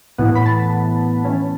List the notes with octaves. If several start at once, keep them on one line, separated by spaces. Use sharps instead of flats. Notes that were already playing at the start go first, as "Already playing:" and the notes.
A2 E3 B3 F#5
B5
A5
E3 C#4